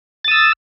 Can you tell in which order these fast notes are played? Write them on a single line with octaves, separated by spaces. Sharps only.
A6 D#6 E6